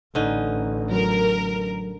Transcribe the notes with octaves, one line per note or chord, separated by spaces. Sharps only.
A1 D3 C#4 D#4
F#3 A#4